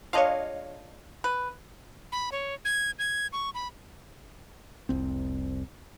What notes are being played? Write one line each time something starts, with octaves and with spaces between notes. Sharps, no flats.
G#3 D4 F4 C#5 D#5 F5
B4
B5
C#5
G#6
G#6
C#6
B5
F1 C2 C4